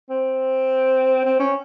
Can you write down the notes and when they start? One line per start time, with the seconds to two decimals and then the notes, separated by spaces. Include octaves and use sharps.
0.10 C4
1.25 C4
1.40 C#4